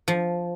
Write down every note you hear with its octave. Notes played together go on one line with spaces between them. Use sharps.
F3